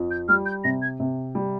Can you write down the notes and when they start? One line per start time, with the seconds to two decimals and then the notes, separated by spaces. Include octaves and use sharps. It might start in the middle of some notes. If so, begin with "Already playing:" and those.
Already playing: F2
0.11 G6
0.28 G3 F6
0.46 G6
0.64 C3 A#6
0.82 G#6
1.00 C3
1.35 G3